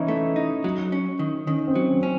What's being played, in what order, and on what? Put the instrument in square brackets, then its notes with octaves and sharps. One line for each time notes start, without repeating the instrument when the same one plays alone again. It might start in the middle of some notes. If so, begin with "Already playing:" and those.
Already playing: [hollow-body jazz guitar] E3 [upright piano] C#4 D#4 E4
[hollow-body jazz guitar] A3
D#4
F#3
C#4
D#3
[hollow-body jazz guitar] D#3 [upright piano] C#4
[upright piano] C4
[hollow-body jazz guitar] F#3
[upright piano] C#4
[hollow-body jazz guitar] C#4